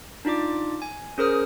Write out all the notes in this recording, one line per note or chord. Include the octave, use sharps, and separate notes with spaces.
D4 D#4 F4 D5 D6
G#5
C#4 G#4 A#4 C5 D#6 F6